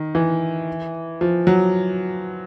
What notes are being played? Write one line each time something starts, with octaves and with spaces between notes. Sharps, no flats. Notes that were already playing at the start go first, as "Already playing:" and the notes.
Already playing: D#3
E3
F3
F#3